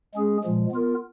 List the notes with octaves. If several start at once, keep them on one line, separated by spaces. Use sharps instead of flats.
G#3 C#4 G#4
A#2 F3 G#3
B3 F4 A#4